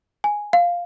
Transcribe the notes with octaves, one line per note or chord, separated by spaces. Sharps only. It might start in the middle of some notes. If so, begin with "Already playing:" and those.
G#5
F5